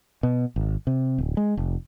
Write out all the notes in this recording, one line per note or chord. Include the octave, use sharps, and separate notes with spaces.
B2
G#1
C3
D1
G#3
F1